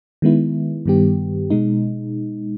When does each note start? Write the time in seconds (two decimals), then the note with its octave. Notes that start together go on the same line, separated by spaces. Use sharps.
0.22 D#3 G#3 B3 E4
0.86 G2 D#3 G3 B3 G4
1.50 B2 G#3 D#4